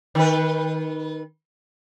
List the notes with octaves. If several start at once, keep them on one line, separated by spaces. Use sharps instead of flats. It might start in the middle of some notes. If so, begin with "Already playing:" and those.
D#3 B4